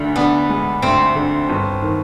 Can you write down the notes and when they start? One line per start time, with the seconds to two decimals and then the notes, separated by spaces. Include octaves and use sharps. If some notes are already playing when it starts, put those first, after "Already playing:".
Already playing: D2 D3
0.16 B3 D4
0.49 G#3
0.82 D2 C4
1.15 D3
1.50 G1
1.82 D#3